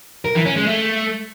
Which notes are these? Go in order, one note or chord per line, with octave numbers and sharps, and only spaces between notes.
A#4
E3
C#4
G#3
A3